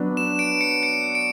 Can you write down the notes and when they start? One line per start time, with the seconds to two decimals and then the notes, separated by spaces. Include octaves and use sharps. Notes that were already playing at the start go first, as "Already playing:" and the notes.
Already playing: F#3 B3 D4 B4
0.17 E7
0.39 D7
0.61 C#7
0.83 C#7
1.15 D7